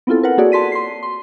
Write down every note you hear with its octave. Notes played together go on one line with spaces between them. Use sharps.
B3 C4 E4 F4 A4
A#4 B4 F#5
A#3 F#4 G#4 A4 C#5 D5
A5 C6 B6 D#7
C6 C7
C6